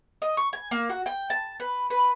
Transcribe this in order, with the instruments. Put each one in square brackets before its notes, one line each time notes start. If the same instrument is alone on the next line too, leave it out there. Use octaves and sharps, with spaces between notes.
[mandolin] D#5
C#6
G#5
A#3
F#4
G5
A5
B4
B4